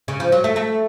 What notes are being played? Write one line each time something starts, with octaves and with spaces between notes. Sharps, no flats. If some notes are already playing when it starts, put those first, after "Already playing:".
C#3
F3
F#3
A3
A3